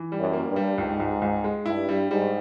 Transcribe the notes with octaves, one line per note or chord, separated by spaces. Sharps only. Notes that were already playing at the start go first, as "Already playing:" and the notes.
Already playing: E3
G3
F#2
A#3
G2
G3
C#2 G#2
C#2
C#2
G#3
G2 E4
G3
G#2 G3